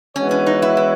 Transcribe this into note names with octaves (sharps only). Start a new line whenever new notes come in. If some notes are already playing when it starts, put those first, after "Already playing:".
E3 G#3 B3 C#4 F#4 C#5
C#4
D#4
E4
E4